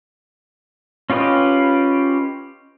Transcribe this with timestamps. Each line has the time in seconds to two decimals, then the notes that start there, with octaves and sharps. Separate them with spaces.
1.10 C#4 F4 G4 B4 D#5